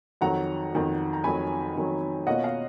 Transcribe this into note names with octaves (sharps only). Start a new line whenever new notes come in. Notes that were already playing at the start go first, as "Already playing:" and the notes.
F2 D#3 F#3 F#5 A#5
F2 D#3 F#3
A#5
F2 D#3 F#3 G#5 B5
F2 D#3 F#3
B2 A#3 C#4 F4 D#5 F#5
F5